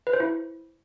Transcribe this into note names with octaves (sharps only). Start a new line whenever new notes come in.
B4
C5
E4